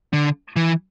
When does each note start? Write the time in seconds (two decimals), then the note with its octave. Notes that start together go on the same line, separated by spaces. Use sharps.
0.13 D3
0.56 E3